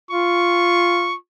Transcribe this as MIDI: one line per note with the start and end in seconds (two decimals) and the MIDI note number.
0.11 1.15 65
0.11 1.16 85